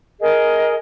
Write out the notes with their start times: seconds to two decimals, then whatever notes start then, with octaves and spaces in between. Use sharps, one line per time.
0.20 G#4 A#4 D#5